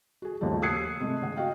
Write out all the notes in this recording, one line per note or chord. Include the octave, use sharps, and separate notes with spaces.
F#4 G#4
D#2 C#3 F3 G3 A3
D#6 E6 F#6 G#6 C7 C#7
C3 G#3 A3
C#3 F#5
F#4 D#5 F5 G5